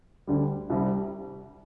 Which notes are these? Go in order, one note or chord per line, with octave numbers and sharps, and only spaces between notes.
D2 D3 G3
C2 C3 G3